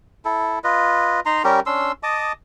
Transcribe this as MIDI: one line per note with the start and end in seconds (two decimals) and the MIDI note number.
0.25 0.59 64
0.25 0.59 69
0.64 1.20 65
0.64 1.20 71
0.64 1.20 75
1.26 1.43 63
1.26 1.43 82
1.26 1.43 84
1.44 1.60 55
1.44 1.60 61
1.44 1.60 67
1.44 1.60 70
1.66 1.92 61
1.66 1.92 62
1.66 1.92 84
1.66 1.92 88
2.03 2.32 75
2.03 2.32 81
2.03 2.32 86
2.03 2.32 87